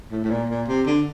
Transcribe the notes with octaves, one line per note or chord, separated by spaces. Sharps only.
A2
A2
A#2
A#2
C3
D3